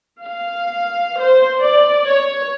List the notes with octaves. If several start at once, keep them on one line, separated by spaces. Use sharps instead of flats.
F5
C5
D5
C#5